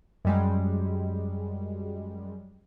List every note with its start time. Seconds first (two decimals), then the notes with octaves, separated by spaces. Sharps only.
0.25 F#2 G3 G#3